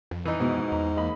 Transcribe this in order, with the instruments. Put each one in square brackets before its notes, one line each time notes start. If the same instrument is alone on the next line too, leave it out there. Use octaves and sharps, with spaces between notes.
[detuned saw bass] F2
[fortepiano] E3 D#4
[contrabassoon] G#2 [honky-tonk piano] B2
[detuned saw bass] E2 [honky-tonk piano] A#5
[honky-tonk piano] A#3 D#5 B5